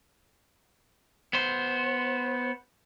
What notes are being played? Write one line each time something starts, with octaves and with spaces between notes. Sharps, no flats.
B3 C5